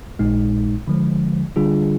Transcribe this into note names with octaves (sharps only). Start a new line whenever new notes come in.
A#1 A#2 G#3 D#4
D3 F3 G#3
D3 G3 D4 F4 G#4